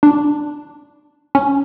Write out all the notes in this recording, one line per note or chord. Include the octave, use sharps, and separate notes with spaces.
D4
C#4